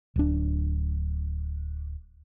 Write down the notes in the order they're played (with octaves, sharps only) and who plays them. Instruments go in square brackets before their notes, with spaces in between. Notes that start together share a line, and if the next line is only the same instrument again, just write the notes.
[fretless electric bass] D1 D4